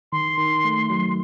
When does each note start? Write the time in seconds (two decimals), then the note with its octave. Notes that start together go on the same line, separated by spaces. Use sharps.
0.12 D#3 C6
0.38 D#3
0.65 A3
0.90 F#3